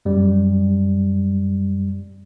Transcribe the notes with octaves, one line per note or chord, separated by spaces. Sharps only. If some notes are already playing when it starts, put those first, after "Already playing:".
F#2 G3